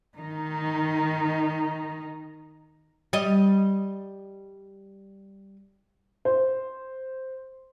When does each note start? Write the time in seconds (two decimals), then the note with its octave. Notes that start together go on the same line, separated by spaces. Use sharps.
0.18 D#3 D#4
3.13 G3 D#5
6.25 C5